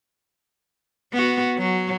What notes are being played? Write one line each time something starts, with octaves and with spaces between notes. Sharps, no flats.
B3 F#4
F#3